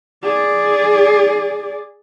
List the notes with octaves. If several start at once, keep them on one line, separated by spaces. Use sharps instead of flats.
G#4 D5